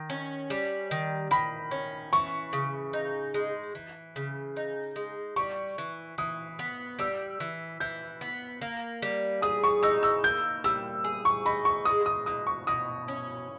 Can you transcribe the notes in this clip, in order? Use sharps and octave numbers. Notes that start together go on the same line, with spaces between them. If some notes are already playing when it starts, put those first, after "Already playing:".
Already playing: D#3
C#4
G3
D#3
D#3 B5
C#4
E3 C#6
C#3
D#4
G#3
E3
C#3
D#4
G#3
G3 C#6
E3
E3 D#6
B3
G3 E6
E3
E3 G6
B3
A#3
G3
G#4 D#6
C#6
D#4 E6
E6
A#3 G6
G3 E6
G#4
C#6
D#4 B5
C#6
G#3 D#6
D#6
B2 D#6
C#6
B2 D#6
C#4